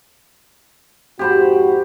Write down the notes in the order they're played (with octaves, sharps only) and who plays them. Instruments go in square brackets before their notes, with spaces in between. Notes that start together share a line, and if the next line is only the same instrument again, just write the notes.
[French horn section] F2 G#2 F#4 [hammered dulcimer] G4 C5 B5